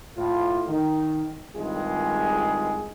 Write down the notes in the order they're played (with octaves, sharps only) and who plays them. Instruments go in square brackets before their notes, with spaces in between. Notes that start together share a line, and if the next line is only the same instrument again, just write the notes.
[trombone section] A2 F4
D#3
C2 G2 D#3 G#3 F4 G#4